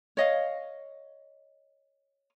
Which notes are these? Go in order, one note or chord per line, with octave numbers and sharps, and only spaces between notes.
C#5 D#5 F5